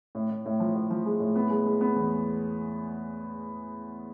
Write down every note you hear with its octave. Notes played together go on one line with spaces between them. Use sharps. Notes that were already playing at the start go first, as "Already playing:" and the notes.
A2
A2
A2
F3
A2
F3
G#3
A2
B3
G#3
G#3
B3
E2